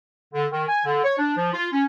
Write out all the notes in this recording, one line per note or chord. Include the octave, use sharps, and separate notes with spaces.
D3
D#3
G#5
D3
C#5
D4
F3
F4
C#4